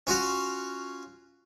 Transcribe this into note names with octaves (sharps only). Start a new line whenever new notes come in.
C#4 F4 F#4